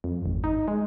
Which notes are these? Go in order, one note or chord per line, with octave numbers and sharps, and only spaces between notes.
F2
G#1
D#4
G#3